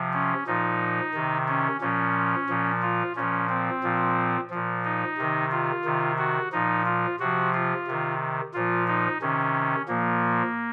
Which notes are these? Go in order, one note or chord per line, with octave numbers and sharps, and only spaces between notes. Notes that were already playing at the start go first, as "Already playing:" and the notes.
Already playing: C3 F3
C#4
A#2 F3 D#4
C3 D#3
C#4
A#2 F3 C#4
A#2 F3
F4
A#2 F3 C#4
C4
A#2 F3
A#2 F3
D#4
C3 D#3
F4
C3 D#3
F#4
A#2 F3 D#4
F4
C3 F3 F#4
F4
C3 D#3
A#2 F3 F4
D#4
C3 D#3 C#4
A#2 F3 A#3